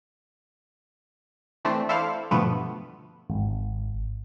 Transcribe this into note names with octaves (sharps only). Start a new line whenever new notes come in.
E3 A3 C4 D4
E4 A4 C5 D5 F5
G2 B2 D3 F3 A3 B3
G#1